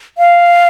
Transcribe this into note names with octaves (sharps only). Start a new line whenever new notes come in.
F5